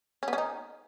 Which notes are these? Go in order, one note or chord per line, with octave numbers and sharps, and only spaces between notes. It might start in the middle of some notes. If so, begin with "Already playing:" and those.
C#4
B3
C#4
D#4